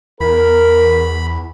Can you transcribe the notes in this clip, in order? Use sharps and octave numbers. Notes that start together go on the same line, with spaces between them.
E2 A#4 B5